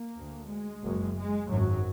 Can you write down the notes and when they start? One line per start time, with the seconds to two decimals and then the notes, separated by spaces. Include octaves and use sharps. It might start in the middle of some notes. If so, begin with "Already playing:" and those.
Already playing: A#3
0.17 D2
0.49 G#3
0.82 F#1 F#2
1.16 G#3
1.48 G#1 F#2 F#3